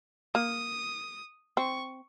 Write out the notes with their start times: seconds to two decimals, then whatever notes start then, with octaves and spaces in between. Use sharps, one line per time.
0.35 A#3 D#6
1.57 C4 C#6